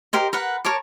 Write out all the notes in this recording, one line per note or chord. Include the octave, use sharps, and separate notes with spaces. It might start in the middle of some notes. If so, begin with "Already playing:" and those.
G4 A#4 C5 D#5
A#4 B4 F#5
A#4 C#5 A5 D6